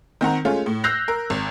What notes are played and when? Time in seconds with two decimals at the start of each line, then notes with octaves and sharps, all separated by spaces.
0.21 D#3 C4 F#5 A#5
0.45 G#3 A3 C#4 F4
0.66 A2
0.84 E6 F#6 G6 A#6 C7 F7
1.08 A#4
1.30 G#1